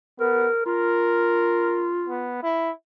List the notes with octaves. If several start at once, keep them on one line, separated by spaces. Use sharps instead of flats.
B3 A#4
F4 A#4
B3
E4